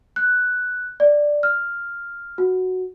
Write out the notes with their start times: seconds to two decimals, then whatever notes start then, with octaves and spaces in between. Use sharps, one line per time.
0.16 F#6
1.00 D5
1.43 F6
2.38 F#4